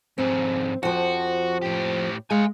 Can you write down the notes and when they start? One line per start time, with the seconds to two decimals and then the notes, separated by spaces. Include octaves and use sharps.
0.18 F2 G#2 C4
0.83 F2 F3 F#4
1.63 A2 G4
2.31 G#3 F5 G#5